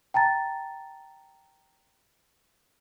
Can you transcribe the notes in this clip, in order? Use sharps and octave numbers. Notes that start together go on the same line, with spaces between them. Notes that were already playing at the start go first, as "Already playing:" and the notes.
G5 A5 A#5 A6